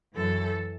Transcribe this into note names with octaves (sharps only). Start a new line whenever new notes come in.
F#2 E3 A4